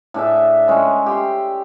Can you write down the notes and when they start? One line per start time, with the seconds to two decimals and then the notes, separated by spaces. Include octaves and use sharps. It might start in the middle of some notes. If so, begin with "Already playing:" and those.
0.14 A2 D4 G#4 E5
0.68 G#3 C#4 C#5 G5
1.06 G4 G5 C6